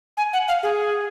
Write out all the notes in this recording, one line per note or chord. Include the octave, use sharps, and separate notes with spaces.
G#5
F#5
F5
G#4